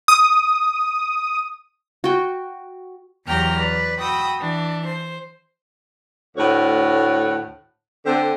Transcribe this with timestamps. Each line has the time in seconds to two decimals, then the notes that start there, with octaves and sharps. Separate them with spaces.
0.08 D#6
2.04 F#4 G5
3.26 E2 F#3 G4 G5 A#5 F6
3.57 B4 D5
3.99 F#4 G5 B5 D#6 E6
4.39 E3 D4
4.86 C5
6.37 D2 A2 C#5 F#5
8.06 D3 C4